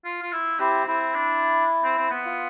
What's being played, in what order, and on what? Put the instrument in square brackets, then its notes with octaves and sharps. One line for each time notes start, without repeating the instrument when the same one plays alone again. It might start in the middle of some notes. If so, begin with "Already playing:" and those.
[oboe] F4
F4
E4
[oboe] C4 [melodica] E4 G4
[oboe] C4 [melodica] E4
[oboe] D4
C4
C4
B3
[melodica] F4